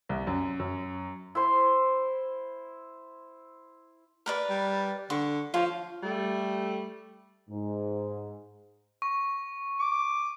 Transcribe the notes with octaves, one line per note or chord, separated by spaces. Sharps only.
C2
F#2
F#2
E4 C5 C6
A#4 B4 D5
G3
D3 C#6
F3 F4 C#5
G3 A3
G#2
C#6
D6